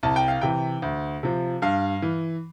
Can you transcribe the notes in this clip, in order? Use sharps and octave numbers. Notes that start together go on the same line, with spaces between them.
C2 A5
G5
F5
C3 E3 G5
D2
C3 F3
G2 F5
E3